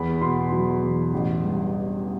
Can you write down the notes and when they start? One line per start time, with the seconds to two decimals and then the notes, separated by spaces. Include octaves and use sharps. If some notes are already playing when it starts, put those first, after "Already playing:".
Already playing: E2 B5
0.21 B2 C6
0.52 F#3
0.82 E2
1.13 A1
1.43 G2